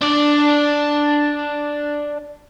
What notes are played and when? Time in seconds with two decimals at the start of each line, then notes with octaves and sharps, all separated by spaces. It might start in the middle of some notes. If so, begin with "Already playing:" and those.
0.02 D4 D5